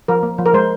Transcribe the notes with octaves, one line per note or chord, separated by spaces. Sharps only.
F3 A#4
A#3
F3
A#4
G#3 C5